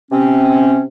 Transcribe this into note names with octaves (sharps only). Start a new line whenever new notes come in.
C3 C4 C#4